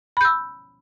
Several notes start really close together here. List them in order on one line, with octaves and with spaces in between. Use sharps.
B5 G6 E6